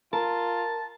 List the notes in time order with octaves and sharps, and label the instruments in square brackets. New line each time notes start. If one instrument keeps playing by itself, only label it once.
[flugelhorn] F4 [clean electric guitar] A#4 [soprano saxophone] A5